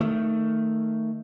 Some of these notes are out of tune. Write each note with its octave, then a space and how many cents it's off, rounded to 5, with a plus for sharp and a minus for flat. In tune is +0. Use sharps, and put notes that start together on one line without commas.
D#3 +5 A3 +15